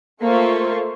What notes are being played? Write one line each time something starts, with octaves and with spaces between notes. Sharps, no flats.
A3 A#3 F4 C5 E5 C#6